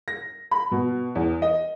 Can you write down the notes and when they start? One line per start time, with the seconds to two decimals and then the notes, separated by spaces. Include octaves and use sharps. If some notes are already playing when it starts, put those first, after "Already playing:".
0.08 A#6
0.51 B5
0.72 B2
1.15 E2
1.42 D#5